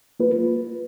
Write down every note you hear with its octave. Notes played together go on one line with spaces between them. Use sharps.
A#3 F4 B4